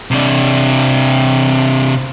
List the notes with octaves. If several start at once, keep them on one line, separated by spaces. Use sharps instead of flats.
C3 D4